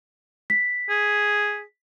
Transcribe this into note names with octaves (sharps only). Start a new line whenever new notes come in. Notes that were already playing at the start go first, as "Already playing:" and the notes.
B6
G#4